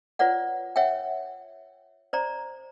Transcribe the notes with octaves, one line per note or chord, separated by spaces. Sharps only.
F4 B4 C#5 D5 F#5
C#5 E5 F#5 G5
C5 D5 A#5